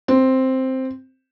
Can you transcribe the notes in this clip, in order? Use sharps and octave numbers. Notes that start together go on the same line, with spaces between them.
C4